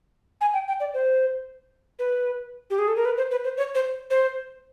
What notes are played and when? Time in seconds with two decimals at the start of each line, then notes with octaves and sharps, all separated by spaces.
0.41 G#5
0.54 G5
0.68 G5
0.80 D5
0.94 C5
1.99 B4
2.70 G4
2.79 G#4
2.88 A4
2.96 A#4
3.05 B4
3.17 C5
3.31 B4
3.44 C5
3.57 C#5
3.75 C5
4.10 C5